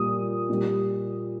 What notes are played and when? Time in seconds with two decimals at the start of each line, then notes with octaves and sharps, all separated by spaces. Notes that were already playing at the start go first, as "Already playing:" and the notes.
Already playing: A#2 G3 D#6
0.50 A#2 G3